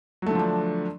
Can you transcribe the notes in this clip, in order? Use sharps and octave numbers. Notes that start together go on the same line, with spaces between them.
D3 F3 F#3 A3 D4